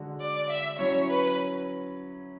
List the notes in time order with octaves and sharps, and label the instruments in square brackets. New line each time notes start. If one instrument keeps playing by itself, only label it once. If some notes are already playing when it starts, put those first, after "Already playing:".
Already playing: [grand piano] D3 G#3 D4 F#4
[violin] D5
E5
[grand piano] F#3 C#4 E4 [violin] C#5
[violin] B4